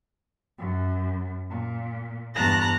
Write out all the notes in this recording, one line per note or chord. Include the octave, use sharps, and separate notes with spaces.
F#2
A#2
E2 G2 A5 A#5 F#6 A#6